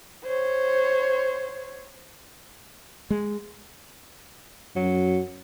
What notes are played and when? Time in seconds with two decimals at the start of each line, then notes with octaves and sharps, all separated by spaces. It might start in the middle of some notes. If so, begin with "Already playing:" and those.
0.24 C5 C#5
3.10 G#3
4.76 F#2 F#3